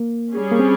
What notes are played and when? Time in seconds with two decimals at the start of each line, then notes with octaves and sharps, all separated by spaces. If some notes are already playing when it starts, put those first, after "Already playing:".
Already playing: A#3
0.33 G3 C#4 G#4
0.52 A#3
0.59 C4